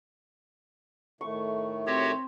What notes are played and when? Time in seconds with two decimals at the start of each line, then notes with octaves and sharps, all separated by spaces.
1.21 A2 D#3 A3 C#6
1.87 C4 F#4 G4 C#5